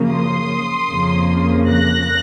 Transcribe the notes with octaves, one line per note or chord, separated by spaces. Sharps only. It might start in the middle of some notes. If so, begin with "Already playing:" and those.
Already playing: F#2 C#3 F3 A#3
C6 D#6
F2 C#3 F3 A#3
F#6 A#6